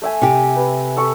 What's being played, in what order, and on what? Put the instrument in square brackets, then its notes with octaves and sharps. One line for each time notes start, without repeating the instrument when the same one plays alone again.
[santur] A3 E5 G#5
[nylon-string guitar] C3 G4
[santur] B4
A4 C#6